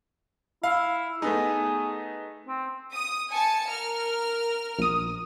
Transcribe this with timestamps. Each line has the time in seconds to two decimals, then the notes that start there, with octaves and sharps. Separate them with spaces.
0.63 E4 F5
1.22 A3 B3 D#4 G#4
2.46 C4
2.95 D#6
3.31 G#5 A5 C#7
3.67 A#4 F6
4.79 A#1 D#6